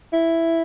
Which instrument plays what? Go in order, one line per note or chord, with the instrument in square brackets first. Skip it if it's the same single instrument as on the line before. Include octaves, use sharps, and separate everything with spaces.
[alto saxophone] E4